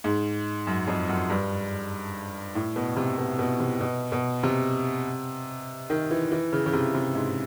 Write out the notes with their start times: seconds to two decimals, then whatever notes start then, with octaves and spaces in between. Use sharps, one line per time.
0.04 G#2
0.67 F#2
0.88 F2
1.09 F#2
1.30 G2
2.55 A2
2.76 B2
2.96 C3
3.18 B2
3.39 B2
3.60 C3
3.81 B2
4.12 B2
4.43 C3
5.90 D#3
6.11 E3
6.32 E3
6.53 C#3
6.66 C#3
6.73 C3
6.95 C3
7.15 G#2